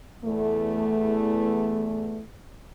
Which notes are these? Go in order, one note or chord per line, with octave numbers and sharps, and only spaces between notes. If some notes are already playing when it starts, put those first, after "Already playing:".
E2 A3